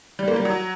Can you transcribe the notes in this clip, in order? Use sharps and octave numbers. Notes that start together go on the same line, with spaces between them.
G3
A#3
G3
F#3